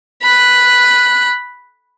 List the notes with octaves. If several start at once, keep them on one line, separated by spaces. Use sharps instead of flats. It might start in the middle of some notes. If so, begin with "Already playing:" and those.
B5 F#6